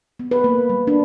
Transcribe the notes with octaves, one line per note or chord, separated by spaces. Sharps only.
B3
B4
A#3
G3
D4